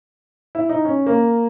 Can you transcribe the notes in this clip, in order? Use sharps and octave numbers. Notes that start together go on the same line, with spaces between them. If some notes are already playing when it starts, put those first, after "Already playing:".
E4
D#4
C#4
A#3